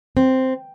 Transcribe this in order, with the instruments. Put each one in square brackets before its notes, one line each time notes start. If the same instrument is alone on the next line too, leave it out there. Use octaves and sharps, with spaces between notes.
[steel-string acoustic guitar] C4